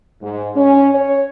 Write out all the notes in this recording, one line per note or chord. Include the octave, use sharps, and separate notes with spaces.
G#2
C#4
C#5